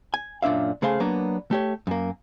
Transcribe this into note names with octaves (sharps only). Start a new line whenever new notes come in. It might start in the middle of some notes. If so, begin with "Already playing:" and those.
G#5
F#2 A#2 D4 E5 F5
C#3 A3 G#4 C5 F5 C6
F#3 A#3 B3 D4
A3 G4 C#5
F#2 A#3